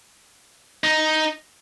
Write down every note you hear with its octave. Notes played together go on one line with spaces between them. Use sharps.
D#4